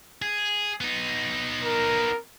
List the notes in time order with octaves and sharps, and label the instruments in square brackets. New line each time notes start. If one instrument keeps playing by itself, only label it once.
[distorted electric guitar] G#4
B3 D#4
[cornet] A#4